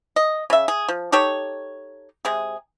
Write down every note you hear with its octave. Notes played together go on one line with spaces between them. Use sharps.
D#5
C#3 E5
G#4
F3
D#4 G4 A4 C#5
C3 G#3 G#4